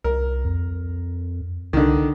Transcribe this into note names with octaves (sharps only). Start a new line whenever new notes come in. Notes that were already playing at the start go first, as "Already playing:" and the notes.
C2 A#4
F2
C2 D3 D#3